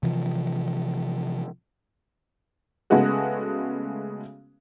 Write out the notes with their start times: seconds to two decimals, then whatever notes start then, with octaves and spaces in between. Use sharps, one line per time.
0.03 C3 E3 F3
2.90 C#3 G#3 A3 B3 F#4 G#4